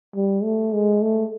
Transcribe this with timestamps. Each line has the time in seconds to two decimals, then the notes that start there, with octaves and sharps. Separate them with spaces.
0.15 G3
0.43 A3
0.73 G#3
1.02 A3